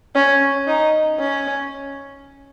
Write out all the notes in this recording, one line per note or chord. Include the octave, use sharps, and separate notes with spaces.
C#4
D#4
C#4